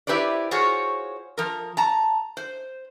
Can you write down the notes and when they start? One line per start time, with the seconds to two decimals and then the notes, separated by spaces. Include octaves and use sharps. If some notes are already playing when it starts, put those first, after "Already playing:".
0.07 E4 G4 B4 C5 D5
0.51 F4 F#4 G#4 C5 C#5
1.38 F3 A#4
1.77 A5 A#5
2.37 C5